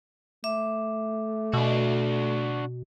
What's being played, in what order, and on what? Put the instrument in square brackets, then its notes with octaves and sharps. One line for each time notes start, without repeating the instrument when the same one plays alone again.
[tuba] A3 [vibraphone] E5 D6
[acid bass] B2 [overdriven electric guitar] D4 F#4